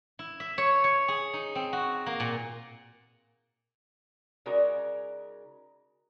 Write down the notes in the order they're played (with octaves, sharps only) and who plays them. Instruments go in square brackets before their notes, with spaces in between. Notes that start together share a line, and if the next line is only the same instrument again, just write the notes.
[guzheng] E4
E5
C#5
C#5
G#4
D#4
C4
F#4
A#3
A#2
[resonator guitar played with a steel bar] C#3 G#3 D#4 F#4 A#4 D5